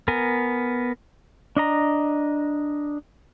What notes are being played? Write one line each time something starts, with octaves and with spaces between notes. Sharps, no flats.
B3 A#4 G#5
D4 D#5 A#5